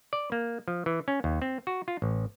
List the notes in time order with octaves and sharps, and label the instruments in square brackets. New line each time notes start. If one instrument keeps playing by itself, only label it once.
[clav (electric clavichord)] D5
A#3
F3
E3
C#4
D#2
C4
F#4
F4
A1